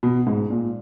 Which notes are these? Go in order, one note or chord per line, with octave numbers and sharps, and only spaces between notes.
B2
G#2
A#2